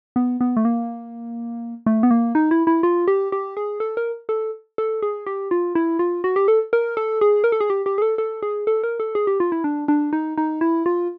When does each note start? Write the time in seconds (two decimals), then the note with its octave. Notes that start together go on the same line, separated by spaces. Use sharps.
0.16 B3
0.41 B3
0.57 A3
0.65 A#3
1.86 A3
2.03 B3
2.11 A#3
2.35 D#4
2.51 E4
2.67 E4
2.83 F4
3.08 G4
3.32 G4
3.57 G#4
3.80 A4
3.97 A#4
4.29 A4
4.78 A4
5.02 G#4
5.26 G4
5.51 F4
5.75 E4
5.99 F4
6.24 F#4
6.36 G4
6.48 A4
6.73 A#4
6.97 A4
7.21 G#4
7.44 A#4
7.52 A4
7.61 G#4
7.70 G4
7.86 G4
7.98 G#4
8.02 A4
8.18 A4
8.43 G#4
8.67 A4
8.83 A#4
9.00 A4
9.15 G#4
9.27 G4
9.40 F4
9.52 E4
9.64 D4
9.88 D4
10.13 D#4
10.38 D#4
10.61 E4
10.86 F4